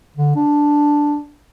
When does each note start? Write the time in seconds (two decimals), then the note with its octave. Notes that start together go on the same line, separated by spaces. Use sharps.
0.16 D3
0.35 D4